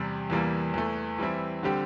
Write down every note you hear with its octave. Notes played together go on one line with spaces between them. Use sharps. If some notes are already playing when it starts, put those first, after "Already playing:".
Already playing: E2 C3 G3
E2 E3 G3 A#3
E2 E3 A3
E3 G3 C4 E4
D3 G3 C4 G4